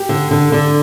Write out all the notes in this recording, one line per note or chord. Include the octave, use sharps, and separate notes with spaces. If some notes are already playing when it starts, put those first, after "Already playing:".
Already playing: G4
D3
D3
D3